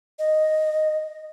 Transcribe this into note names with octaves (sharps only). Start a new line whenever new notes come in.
D#5